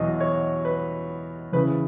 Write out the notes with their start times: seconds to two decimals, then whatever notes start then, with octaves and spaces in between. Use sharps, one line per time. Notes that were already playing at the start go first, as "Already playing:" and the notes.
Already playing: E2 B2 F#3 D#5
0.20 C#5
0.65 B4
1.53 E2 C#3 E3 B4